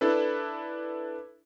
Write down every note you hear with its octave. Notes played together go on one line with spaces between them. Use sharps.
D4 E4 A4 B4